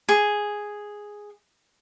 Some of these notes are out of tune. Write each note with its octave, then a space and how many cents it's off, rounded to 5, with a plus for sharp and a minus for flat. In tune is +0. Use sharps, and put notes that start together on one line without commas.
G#4 +0